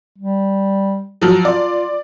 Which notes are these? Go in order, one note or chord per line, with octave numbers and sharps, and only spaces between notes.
G3
F3 F#3
F4 D5